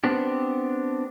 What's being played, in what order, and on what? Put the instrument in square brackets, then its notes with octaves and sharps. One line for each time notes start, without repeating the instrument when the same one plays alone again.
[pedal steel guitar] B3 C4 D4 G4